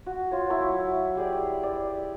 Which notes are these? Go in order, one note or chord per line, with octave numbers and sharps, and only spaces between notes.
F#4
F4 C#5
F#3 E4 C#6
G4 G#4 D5
D5